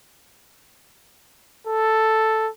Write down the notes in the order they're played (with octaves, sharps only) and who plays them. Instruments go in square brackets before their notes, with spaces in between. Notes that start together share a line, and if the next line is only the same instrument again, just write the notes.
[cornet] A4